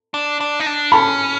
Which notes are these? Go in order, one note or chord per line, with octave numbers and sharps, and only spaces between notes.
D4
D4
D#4
D4
C#4 A5 B5